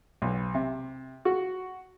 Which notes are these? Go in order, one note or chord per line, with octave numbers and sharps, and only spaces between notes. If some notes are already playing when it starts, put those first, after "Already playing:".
B1
C3
F#4